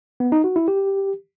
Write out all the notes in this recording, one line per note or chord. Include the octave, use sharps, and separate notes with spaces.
B3
D#4
F#4
E4
G4